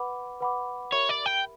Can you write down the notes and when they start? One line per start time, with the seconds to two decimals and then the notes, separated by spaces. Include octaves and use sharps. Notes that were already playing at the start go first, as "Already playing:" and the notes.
Already playing: B4 F#5 B5 D6
0.40 B4 F#5 B5 D6
0.92 G4 A#4 C#5 E5 B5
1.09 D5
1.26 G5